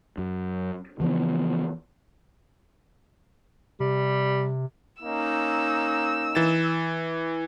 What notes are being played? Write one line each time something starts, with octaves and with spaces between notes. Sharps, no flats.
F#2
C#3 E3 F3 B3
C3 G3
A#3 C#4 D#4 E6
E3 A6 E7